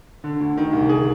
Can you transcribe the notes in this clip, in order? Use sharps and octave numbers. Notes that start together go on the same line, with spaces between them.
D3
D2
D#3
C2
G#4